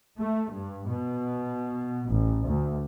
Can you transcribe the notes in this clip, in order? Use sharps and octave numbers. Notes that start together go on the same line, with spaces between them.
A3
G2
B2
A1
D2